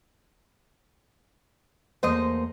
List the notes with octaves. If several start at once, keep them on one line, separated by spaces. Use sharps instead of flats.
E2 A3 A#3 C5 D#5